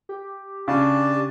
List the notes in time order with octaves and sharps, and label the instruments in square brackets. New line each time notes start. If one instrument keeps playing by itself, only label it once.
[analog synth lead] G4
[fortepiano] C#3 [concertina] D4 A5